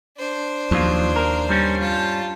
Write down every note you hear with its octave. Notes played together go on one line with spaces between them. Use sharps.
D4 C5
D#2 F3 F#3 F4
A#4
G2 G3 C#4
F4 A5